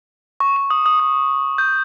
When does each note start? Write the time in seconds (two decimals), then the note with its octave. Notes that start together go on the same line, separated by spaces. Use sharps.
0.40 C#6
0.56 C#6
0.70 D#6
0.86 D#6
1.00 D#6
1.58 G6